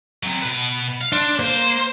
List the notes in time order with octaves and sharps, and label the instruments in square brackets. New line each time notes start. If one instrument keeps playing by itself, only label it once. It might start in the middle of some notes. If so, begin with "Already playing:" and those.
[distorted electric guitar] C3 F#3
B2 B4
F5
[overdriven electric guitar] D4 [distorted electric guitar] C6
[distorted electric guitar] A#3 [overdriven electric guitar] C5